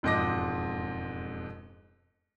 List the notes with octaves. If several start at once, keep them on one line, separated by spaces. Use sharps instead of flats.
E1 F2 G#2 D#5 D6 A#6